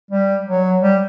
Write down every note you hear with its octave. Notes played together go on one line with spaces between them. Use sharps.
G3
F#3
G3